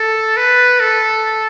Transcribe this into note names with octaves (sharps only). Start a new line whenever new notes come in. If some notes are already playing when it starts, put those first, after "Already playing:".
Already playing: A4
B4
A4